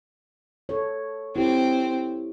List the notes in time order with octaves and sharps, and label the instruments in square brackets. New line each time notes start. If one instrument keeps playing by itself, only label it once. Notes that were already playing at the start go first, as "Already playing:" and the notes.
[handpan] A4 C#5
[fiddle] C4 [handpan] E4 G4